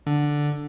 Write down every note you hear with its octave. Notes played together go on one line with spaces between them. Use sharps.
D3